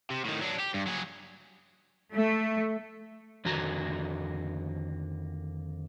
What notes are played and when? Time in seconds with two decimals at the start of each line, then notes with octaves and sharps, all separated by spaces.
0.10 C3
0.25 A2 D#3
0.41 F#3 D4
0.60 G4
0.74 G2
0.87 F#3 G#4
2.13 A3
3.45 F2 D3 D#3 F#4 A#5